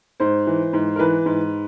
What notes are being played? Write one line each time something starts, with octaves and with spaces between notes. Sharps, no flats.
G#2 C5
E3
G#2
A#4
E3 B4
G#2